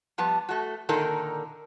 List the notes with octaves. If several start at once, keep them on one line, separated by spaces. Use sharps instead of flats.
F3 G3 B3 A5
A3 F#4
A#2 D3 D#3 D#4 A4 A#4